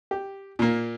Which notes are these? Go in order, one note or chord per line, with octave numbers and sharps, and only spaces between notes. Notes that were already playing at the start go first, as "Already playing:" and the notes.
G4
A#2 A#3